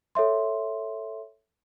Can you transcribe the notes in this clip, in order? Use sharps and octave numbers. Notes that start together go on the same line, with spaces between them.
A4 C#5 E5 C6